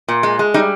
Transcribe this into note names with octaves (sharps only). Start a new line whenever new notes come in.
A#2
G#3
G#3
G3 D#4